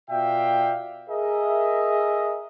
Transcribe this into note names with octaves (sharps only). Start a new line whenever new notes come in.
B2 F4 D5 E5 F5 G5
G#4 A#4 D#5 E5